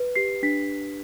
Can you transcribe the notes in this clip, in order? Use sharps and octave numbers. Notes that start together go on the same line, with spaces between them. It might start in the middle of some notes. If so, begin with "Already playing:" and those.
Already playing: B4
G4 C7
D4 B6